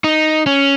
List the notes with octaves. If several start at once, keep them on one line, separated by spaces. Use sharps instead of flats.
D#4
C#4